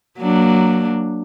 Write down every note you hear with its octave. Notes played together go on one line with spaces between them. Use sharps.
F#3 A#3 D4